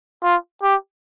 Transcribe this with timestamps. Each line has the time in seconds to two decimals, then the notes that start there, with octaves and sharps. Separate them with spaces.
0.24 F4
0.63 G4